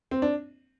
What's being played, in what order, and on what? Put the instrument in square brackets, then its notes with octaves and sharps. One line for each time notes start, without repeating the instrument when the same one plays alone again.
[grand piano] C4
D4